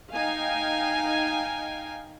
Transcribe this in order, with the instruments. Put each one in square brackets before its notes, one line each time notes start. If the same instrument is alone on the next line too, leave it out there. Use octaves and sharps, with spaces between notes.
[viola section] D#4 F5 G5 G#5